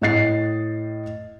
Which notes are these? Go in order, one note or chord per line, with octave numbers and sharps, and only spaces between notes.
A2 D#5 A6 C7